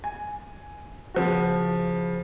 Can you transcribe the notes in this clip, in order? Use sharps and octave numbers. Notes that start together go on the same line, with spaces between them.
G#5
C#3 F3 F#4